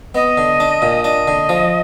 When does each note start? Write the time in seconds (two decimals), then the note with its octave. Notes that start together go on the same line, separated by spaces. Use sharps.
0.15 B3 D#5
0.38 D3
0.60 D4
0.82 A#2
1.04 D4 D#5
1.28 D3
1.49 F3